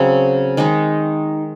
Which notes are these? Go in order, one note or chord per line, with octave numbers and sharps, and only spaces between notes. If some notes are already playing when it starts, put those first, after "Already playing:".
Already playing: C#3 F#3 C4
D#3 G#3 D#4